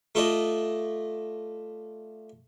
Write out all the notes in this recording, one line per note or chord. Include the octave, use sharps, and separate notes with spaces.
A3 F4 A4 D5 D#5